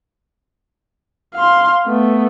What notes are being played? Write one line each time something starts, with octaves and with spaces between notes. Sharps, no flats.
F5 C6
A3 B3